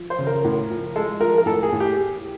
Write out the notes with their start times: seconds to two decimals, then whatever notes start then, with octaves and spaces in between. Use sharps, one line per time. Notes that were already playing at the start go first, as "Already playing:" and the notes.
Already playing: F3
0.10 C5
0.19 C#3
0.27 A#4
0.44 A2
0.70 F3
0.96 G#3 A4
1.21 F3 A#4
1.38 A#4
1.46 A2 A4
1.63 G#4
1.73 A2
1.80 G4